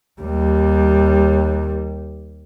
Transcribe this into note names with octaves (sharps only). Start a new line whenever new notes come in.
D#2 G3